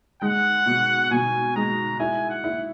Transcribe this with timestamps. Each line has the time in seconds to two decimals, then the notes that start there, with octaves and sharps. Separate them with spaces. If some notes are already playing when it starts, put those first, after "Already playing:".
0.22 G#3 F#5
0.66 B2
1.11 B2 G#5
1.56 G#3 A#5
1.99 E4 G#5
2.30 F#5
2.44 E4